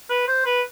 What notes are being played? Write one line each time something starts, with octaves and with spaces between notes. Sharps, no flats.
B4
C5
B4